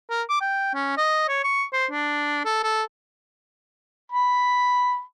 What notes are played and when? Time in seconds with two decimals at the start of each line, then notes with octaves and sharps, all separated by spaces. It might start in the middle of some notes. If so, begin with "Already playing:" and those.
0.10 A#4
0.30 D6
0.41 G5
0.75 C#4
0.98 D#5
1.29 C#5
1.44 C#6
1.73 C5
1.91 D4
2.45 A4
2.63 A4
4.12 B5